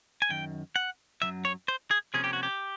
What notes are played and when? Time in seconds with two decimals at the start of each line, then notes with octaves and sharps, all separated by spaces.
0.22 G#5
0.29 F#2 D#3 G5
0.76 F#5
1.22 F#2 D#3 F#3 E5
1.45 C#5
1.68 C5
1.91 G#4
2.14 C3 F3 A#3 C#4 G#4
2.24 G4
2.33 F#4
2.43 G4